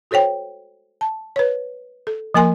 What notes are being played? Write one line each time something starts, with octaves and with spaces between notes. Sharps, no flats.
F#4 A4 C5 C#5 G5
A5
B4 C#5
A4
F3 A#3 A#4 G#5 C6